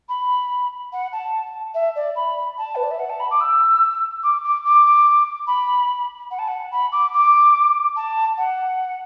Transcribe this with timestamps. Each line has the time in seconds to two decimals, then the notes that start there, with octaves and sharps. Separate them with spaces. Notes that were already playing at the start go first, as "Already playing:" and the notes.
0.09 B5
0.93 F#5
1.13 A5
1.74 E5
1.96 D5
2.16 B5
2.58 A5
2.76 B4
2.83 D5
2.91 E5
2.99 F#5
3.10 A5
3.20 B5
3.31 D6
3.40 E6
4.23 D6
4.44 D6
4.65 D6
5.47 B5
6.31 F#5
6.39 A5
6.48 F#5
6.71 B5
6.92 D6
7.13 D6
7.96 A5
8.37 F#5